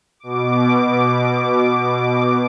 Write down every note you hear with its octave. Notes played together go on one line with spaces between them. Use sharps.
B2 D6